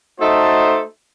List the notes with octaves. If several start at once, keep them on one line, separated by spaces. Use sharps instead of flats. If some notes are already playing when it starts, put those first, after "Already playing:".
A3 D#4 F#4 A4 C5 D#5